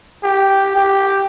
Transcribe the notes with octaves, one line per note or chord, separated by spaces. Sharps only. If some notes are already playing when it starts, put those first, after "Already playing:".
G4
G4